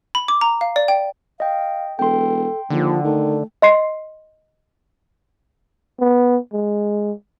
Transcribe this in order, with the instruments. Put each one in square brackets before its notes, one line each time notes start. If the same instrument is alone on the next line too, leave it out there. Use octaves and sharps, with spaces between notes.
[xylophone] B5
D6
A#5
F5
D5
G5
[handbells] D#5 G5 [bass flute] F5
[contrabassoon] E1 [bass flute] A4 [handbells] G5 C6
[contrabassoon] D#2 [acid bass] D3 [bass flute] F3
[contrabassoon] D#3 [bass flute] A3
[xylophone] D#5 C6 C7
[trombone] B3
G#3